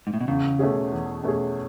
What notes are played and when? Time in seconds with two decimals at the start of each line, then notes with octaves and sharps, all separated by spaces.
0.07 G#2
0.14 A2
0.21 B2
0.27 E2 C#3
0.59 B2 A3 C#4 G#4
0.92 E2
1.23 B2 A3 C#4 G#4